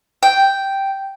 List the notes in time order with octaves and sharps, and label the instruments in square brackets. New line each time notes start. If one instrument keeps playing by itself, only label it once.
[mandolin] G5